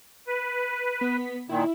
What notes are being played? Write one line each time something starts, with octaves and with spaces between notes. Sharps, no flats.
B4
B3 B6
A#2 D#3 E4